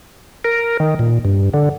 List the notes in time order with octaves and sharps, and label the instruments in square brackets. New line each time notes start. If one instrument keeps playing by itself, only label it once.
[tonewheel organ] A#4
D#3
A#2
G2
D3